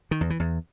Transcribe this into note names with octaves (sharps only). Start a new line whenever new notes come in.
D#3
E2
E3
E2